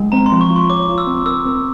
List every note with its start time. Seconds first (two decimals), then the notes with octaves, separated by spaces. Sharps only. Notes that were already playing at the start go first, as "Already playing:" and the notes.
Already playing: G#3
0.12 C4 A#5
0.26 C6
0.32 F3
0.41 C#6
0.50 F4
0.56 C6
0.70 C#5 D6
0.89 F4
0.98 E6
1.07 C4
1.26 A#4 E6
1.46 C4